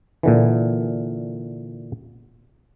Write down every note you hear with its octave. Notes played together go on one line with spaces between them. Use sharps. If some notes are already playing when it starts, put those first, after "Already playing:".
A#2 D3 E3